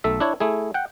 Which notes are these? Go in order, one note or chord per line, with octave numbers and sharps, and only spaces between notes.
B1 A3 A4 E5
D4 E4 C#5
A3 E4 G#4
F#5 G5